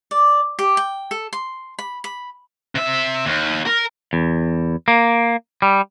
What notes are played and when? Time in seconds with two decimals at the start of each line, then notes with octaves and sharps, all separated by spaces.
0.11 D5
0.59 G4
0.77 G5
1.11 A4
1.33 C6
1.79 B5
2.04 B5
2.75 C3 E5
3.26 D#2
3.66 A#4
4.13 E2
4.88 A#3
5.62 G3